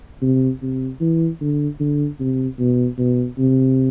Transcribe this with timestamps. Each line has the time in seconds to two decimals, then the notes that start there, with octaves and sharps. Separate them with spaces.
0.22 C3
0.62 C3
1.01 E3
1.41 D3
1.80 D3
2.20 C3
2.59 B2
2.98 B2
3.39 C3